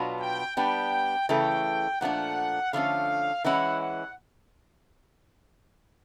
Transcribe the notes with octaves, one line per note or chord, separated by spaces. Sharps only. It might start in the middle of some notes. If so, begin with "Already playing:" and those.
Already playing: B2 F#3 B3 D4 F4
G5
G3 B3 D4 G5
C#3 E3 A3 G5
A#2 F3 A3 D4 F#5
D3 F3 A3 C#4 F5
E3 G#3 C#4 E4 F#5
F#5